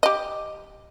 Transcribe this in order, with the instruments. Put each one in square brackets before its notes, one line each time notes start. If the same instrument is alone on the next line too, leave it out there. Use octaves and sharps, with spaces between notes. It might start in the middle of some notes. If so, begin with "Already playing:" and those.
[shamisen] G4 D#5